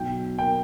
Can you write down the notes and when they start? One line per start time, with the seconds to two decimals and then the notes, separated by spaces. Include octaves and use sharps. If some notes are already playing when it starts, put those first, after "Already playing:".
Already playing: B1 G5
0.39 A#3 G5